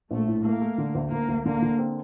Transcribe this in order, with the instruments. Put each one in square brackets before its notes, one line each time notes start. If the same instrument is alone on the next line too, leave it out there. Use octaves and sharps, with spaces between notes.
[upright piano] A#1 [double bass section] A3
[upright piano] A2
[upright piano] A3 [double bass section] A#3
[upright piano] A3
D3
D2
[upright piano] D2 [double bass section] A#3
[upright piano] D2
[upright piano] D3 [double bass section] A#3
[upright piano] D3
C4